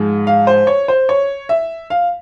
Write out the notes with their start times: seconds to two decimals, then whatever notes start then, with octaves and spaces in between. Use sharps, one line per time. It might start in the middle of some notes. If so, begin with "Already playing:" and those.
Already playing: G#2 F3 G#3
0.27 F5
0.47 C5
0.67 C#5
0.88 C5
1.09 C#5
1.49 E5
1.90 F5